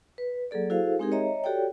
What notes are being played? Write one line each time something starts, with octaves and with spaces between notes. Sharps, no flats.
B4
F#3 A#3 G#4 A4 D5
E4 F#4 G#4 A4 C5 F5
G#3 C4 D#4 G4 G#4 A#4
C#5 D#5 E5 A#5
F#4 G4 A4 C#5 D5 G5